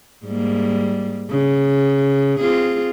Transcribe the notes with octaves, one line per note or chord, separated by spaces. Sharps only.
G#2 G3 A#3
C#3
C4 F4 G#4